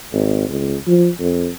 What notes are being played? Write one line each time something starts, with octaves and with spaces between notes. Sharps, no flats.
G#1
C#2
F3
F2